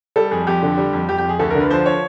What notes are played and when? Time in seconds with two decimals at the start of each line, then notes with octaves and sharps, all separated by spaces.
0.16 G3 A4
0.31 F2 G#4
0.47 F2 G4
0.62 D3
0.78 G3
0.93 F2
1.08 F2 G4
1.18 G4
1.24 F2 G#4
1.39 D2 A4
1.50 D3 A#4
1.60 B4
1.70 F3 C5
1.86 C#5